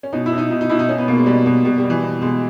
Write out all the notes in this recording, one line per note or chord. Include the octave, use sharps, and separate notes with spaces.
C#4
B2 D#4
E4
B2
D#4
B2 D#4
D#4
B2 E4
D#4
B2 C#4
B3
B2 A#3
G#3
B2 G3
B2
B2 G3
G3
B2
E3
B2
B2 G#3